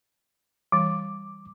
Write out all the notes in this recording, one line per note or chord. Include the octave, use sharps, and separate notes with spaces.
E3 G3 D6